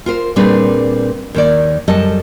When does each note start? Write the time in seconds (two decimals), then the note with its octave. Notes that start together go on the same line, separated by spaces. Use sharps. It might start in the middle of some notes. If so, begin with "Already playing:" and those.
0.06 F4 A#4 C5
0.36 A#2 G3 C4 D4 G#4 B4
1.34 D#2 D#3 D5
1.88 F#2 G3 A4 D#5 A5